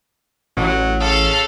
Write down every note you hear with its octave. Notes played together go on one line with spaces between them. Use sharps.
A1 F#3
C#3 A4 F5